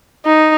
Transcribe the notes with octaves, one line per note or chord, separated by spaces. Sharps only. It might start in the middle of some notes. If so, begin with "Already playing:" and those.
D#4